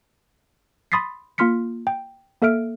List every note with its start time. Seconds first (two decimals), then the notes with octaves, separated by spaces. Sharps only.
0.92 B5 C6 D#6 A6 B6 C7
1.38 A#3 F4 C6 F6 B6 C#7
1.87 G5
2.42 A#3 A4 E5 F6 D7